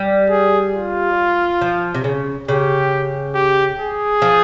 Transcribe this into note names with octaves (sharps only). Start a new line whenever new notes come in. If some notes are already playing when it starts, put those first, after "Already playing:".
Already playing: G3
G#4
F4
F3
C3
C#3
C#3 G4
G4
G#4
F3